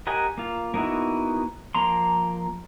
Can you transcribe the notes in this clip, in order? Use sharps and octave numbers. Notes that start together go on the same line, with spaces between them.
G4 A#4 D#5 F#5 G#5
A#3 F4
A#3 B3 D#4 E4 F#4
F3 A#3 A#5 C6